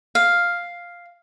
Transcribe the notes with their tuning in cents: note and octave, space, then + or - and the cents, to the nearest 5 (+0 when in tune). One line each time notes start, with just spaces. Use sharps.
F5 +0